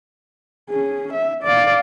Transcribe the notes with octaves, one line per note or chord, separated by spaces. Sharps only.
C#4 G#4
E5
D5 F5